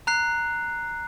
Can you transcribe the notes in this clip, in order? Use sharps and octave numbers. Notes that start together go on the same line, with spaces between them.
A#5 F#6 C7